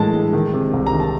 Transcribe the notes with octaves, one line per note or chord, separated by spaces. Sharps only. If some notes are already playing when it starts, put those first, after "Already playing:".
Already playing: A2 E3 G#3 A5
G#3
D#3
C3
C2
A#5
D#3
A5